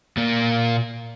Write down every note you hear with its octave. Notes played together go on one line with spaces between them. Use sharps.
A#2 A#3